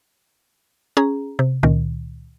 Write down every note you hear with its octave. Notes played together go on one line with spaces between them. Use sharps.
C#4 G#4 A#5
C3
C#2 A#2 D#3